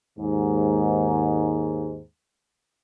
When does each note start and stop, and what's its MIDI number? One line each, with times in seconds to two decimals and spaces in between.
0.18 1.99 39
0.18 1.99 44